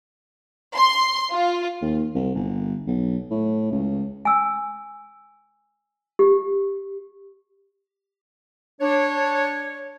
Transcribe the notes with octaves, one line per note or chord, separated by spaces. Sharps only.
C6
F4
D#2
C2
G1
B1
A2
C#2
G#5 E6
G4
D4 C#5